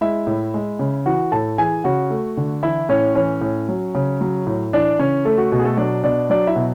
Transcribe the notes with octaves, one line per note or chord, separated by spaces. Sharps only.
G#3 E4 E5
A2
G#3
C#3
E3 F#4 F#5
A2 A4 A5
E3 G#4 G#5
C#3 F#4 F#5
A3
D3
E3 E4 E5
A2 C#4 C#5
E3 C#4 C#5
A2
F#3
C#3
F#3
A2
E3 D4 D5
C#3 C#4 C#5
A3 A4
F#4
B2 F#4
G#4
A3 A4
F#3 D4 D5
B2 D4 D5
F#3 D4 D5
E4 E5
B2